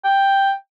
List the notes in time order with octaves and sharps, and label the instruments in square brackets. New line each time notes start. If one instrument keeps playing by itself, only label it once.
[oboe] G5